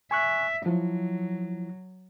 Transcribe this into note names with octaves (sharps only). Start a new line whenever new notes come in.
E5 G#5 C#6 F#6
F3 F#3 E4